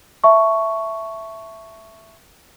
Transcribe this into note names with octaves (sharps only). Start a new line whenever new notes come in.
E5 A5 C#6